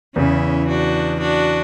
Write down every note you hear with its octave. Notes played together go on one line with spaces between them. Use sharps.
E2 C#3 E3 C#4 E4
D4 F#4
D4 F#4